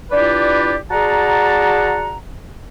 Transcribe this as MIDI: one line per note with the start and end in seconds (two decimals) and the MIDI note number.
0.11 0.75 62
0.11 0.75 64
0.11 0.75 65
0.11 0.75 67
0.11 0.75 71
0.11 0.75 74
0.90 2.17 66
0.90 2.17 68
0.90 2.17 74
0.90 2.17 78
0.90 2.17 81
0.90 2.17 82